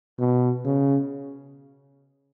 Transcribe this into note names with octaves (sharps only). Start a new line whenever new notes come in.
B2
C#3